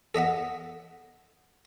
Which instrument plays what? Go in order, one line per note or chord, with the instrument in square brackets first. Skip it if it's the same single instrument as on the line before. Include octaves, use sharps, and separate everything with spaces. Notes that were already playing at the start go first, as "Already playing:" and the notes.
[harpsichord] A4 D#5 E5 F#5